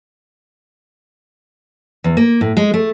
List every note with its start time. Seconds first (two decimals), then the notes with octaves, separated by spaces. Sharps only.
2.04 E2
2.17 A#3
2.41 A2
2.57 G#3
2.74 A3